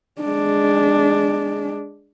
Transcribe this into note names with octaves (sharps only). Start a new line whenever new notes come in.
G#3 D4